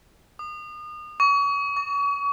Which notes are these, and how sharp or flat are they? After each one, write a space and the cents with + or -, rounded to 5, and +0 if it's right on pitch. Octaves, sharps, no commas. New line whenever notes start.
D#6 -35
C#6 +35
C#6 +40